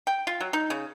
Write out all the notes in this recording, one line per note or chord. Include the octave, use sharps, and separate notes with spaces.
G5
F4
F#3
D#4
C#3